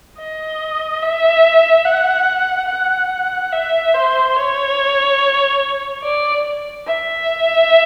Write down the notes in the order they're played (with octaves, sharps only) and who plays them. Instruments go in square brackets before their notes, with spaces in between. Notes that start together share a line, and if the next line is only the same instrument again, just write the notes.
[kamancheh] D#5
E5
F#5
F#5
E5
C5
C#5
D5
E5